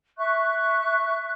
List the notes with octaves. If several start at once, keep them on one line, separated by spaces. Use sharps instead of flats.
E5 C#6 F#6